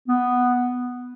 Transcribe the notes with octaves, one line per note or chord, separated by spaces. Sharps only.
B3